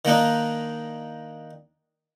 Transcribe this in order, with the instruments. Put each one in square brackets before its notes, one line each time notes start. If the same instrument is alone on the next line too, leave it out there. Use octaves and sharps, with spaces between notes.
[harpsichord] D#3 A#3 D4 D#4